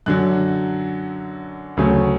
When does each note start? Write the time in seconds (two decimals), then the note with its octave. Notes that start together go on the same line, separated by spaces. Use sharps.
0.06 F#2 D3 F#3 F#6
1.77 D2 C#3 F#3 A3